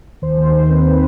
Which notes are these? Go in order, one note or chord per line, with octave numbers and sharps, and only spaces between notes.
D#2 C5
D#3
D#2
C4 B4
C4